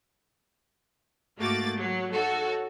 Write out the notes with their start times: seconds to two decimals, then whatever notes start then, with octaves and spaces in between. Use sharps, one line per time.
1.38 G#2 A3 A#3 F#4 D6 A6
1.78 F#3
2.12 D#4 F#4 A4 C#5